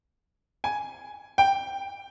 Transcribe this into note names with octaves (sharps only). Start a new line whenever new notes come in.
G#5
G5